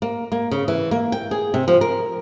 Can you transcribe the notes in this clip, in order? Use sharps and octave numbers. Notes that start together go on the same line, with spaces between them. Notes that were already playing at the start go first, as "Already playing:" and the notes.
A#3
A#3
C#3
E3
A#3
G5
G#4
C3
F3
A#4